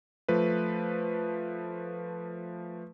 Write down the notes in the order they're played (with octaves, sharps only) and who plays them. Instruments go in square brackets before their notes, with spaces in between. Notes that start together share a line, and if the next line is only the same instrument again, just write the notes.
[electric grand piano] F3 A3 B4